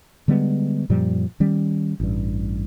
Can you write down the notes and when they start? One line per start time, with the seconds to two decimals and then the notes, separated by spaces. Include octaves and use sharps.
0.28 D3 G3 G#3 B3
0.89 F#2 A#2 F3 G3
1.40 D#3 G3 C#4
2.00 A1 G2